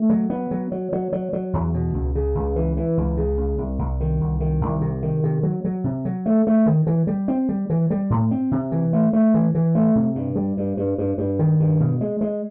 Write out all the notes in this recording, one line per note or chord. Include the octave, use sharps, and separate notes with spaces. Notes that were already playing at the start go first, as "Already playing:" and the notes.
Already playing: A3
F#3
B3
F#3
F#3
F#3
F#3
F#3
E2
B2
C#2
C#3
C#2
E3
E3
C#2
C#3
C#2
C2
C2
D#3
C2
D#3
C2
C3
D#3
C3
F#3
F#3
C3
F#3
A3
A3
D#3
E3
G3
C4
G3
E3
G3
A2
C4
C3
E3
A3
A3
E3
E3
A3
C3
G2
G3
G2
G2
G2
G2
D#3
G2
B2
G#3
G#3